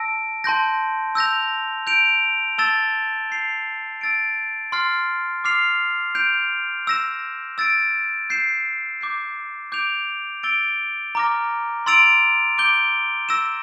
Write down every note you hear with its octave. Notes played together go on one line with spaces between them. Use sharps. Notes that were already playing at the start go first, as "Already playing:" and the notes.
Already playing: A5 E6 A#6 D7
A5 C6 G6 A#6
E6 G6 A#6 F7
G6 D7 F7
A5 E6 A6 E7 G7
G6 C7 F7
E6 A6 D7
C6 F6 A6 C7
D6 F6 C7 F7
G6 D7 F7
E6 A#6 E7
E6 A6 D7
G6 C7 E7
D6 G6 C7
D6 G6 D7 F7
E6 A6 D7 G7
A#5 D6 F6 A#6
C6 E6 A6 D7 F7
D6 G6 D7 G7
E6 A#6 E7